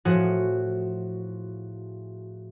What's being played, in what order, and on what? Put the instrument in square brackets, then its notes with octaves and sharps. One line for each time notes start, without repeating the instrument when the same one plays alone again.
[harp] A2 F3 F#4 G#4